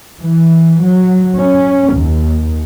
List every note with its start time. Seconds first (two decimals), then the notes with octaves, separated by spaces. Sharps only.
0.22 E3
0.80 F#3
1.37 C#4
1.93 D#2